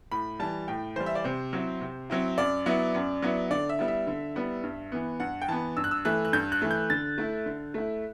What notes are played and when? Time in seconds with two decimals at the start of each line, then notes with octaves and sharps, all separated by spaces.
0.12 A2 B5
0.40 E3 G3 A5
0.68 A2 G5
0.96 E3 G3 C5
1.06 E5
1.15 D5
1.24 C3 C5
1.53 F#3 C4 E4
1.81 C3
2.10 F#3 C4 E4
2.38 F#2 D5
2.66 F#3 B3 E4
2.95 F#2
3.22 F#3 B3 E4
3.51 D3 D5
3.69 E5
3.79 G3 B3 E4
3.88 E5
4.07 D3
4.35 G3 B3 E4
4.64 G2
4.92 E3 B3
5.20 G2 F#5
5.42 G5
5.48 E3 B3 A5
5.77 G2 E6
5.84 F#6
5.91 E6
6.05 E3 A3 F#6
6.25 F#6
6.33 G2 G6
6.52 F#6
6.62 E3 A3
6.71 G6
6.90 D3 A6
7.18 A3 E4
7.46 D3
7.74 A3 E4